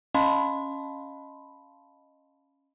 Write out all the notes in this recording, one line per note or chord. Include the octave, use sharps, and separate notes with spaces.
C#4 D#5 F5 A5 B5 C6